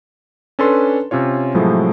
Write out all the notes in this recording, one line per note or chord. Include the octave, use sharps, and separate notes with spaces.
C#4 D4 A4 B4 A5 C6
C3 C#4 F4 C#5
A2 C3 F3 F#3 G#3 A3